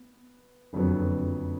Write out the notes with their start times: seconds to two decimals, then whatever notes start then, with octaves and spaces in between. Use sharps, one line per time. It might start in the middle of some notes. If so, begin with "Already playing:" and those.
Already playing: B3
0.73 F#1 F2 D3 F#3 B3